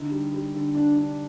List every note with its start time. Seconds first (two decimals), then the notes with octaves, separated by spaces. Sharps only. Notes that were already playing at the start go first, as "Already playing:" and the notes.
Already playing: D3 D#4
0.11 G3
0.33 G3
0.54 D3
0.75 D4
0.97 D4